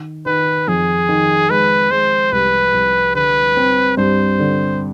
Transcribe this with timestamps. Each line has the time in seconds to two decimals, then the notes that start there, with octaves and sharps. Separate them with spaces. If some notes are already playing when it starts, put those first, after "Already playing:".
Already playing: D#3
0.26 D#3 B4
0.68 F2 G#4
1.09 D#3
1.50 G#3 B4
1.91 G#3 C5
2.32 C2 B4
2.74 C2
3.15 D3 B4
3.57 C4
3.97 G2 C5
4.39 D3